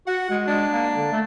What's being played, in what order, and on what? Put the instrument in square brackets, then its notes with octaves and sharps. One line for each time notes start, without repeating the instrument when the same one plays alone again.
[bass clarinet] F#4 [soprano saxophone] F#5
[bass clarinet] G#3
[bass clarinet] G#3 [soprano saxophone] D4
[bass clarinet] A#3
D3
A3